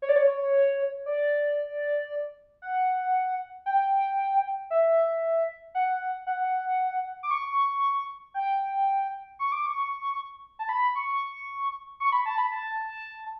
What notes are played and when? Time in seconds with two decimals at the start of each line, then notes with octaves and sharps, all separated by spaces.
0.02 C#5
0.09 D5
0.16 C#5
0.27 C#5
1.06 D5
2.62 F#5
3.66 G5
4.70 E5
5.75 F#5
6.27 F#5
7.23 D6
7.31 C#6
8.34 G5
9.39 C#6
9.52 D6
9.66 C#6
10.59 A5
10.69 B5
10.95 C#6
12.00 C#6
12.12 B5
12.26 A5
12.38 B5
12.52 A5